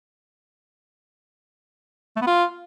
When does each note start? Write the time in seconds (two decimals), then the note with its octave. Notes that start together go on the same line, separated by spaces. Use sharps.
2.17 A3
2.22 B3
2.27 F4